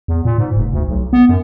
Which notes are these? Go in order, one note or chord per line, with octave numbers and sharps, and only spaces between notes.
E2
A#2
G#2
F1
D2
B1
B3
F#2